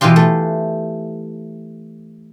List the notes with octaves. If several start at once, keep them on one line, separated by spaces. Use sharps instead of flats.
B2 E3 F4 G4 C6
A3